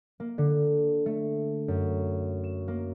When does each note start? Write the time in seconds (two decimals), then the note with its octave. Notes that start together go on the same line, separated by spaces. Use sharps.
0.20 A#3
0.38 D3
1.06 A3
1.68 F#2
2.44 E7
2.68 A#3